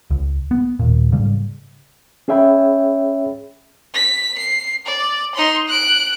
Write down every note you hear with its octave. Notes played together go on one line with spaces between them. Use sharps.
C#2
B3
D#1 A#2
G#2 C#3 G3
C#4 G#4 C#5 E5 G5 B5
B6
C7
D5
D#4 C6
F#6 D7